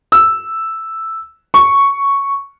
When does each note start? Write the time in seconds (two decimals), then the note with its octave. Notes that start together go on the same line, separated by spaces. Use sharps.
0.12 E6
1.54 C#6